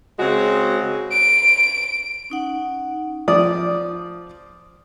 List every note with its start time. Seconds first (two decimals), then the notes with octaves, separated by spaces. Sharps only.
0.18 C#3 G#3 C4 F#4
1.11 D7
2.30 C#4 D#4 F#5
3.28 F3 D5 D#6